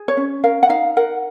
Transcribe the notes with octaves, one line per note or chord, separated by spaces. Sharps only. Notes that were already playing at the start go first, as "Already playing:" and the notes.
Already playing: G#4
C#5
C#4
A#4 F5
F#5
D#4 F5
A#4 F#5